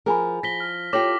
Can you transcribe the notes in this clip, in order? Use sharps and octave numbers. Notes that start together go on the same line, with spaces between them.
F3 G#4 A#4 G#5 B5
F3 A#6 B6 G7
F6
F4 G4 A4 C#5 D6 A#6 F#7